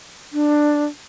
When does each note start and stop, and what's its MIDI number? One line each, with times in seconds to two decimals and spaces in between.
0.33 0.85 62